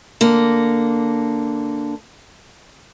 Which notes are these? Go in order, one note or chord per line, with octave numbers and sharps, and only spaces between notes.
D3 A#3